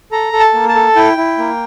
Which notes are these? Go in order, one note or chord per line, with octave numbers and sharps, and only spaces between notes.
A4 A#5
A4
A5
A#3
A5
A4
E4 G5
E4
A#3